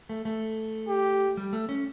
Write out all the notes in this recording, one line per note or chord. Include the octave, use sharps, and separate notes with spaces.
A3
A3
G4
G3
A3
C#4